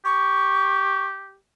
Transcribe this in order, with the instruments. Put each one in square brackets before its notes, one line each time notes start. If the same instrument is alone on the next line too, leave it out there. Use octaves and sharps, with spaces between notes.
[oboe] G4 [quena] C#6